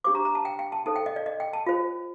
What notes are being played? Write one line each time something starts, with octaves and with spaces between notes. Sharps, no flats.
D4 G4 C5 D6
A#5
A#5
A5
G5
G5
A5
D#4 A4 C5 A5
G5
D#5
D5
D#5
G5
A5
F4 C5